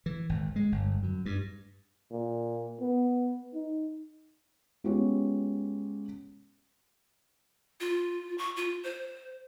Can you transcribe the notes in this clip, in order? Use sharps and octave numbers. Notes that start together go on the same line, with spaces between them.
E3
G#1
G#3
G1
F#2
G2
A#2
B3
D#4
G#3 B3 C#4 F4 G4 C#5
F4
C#6
F4
C5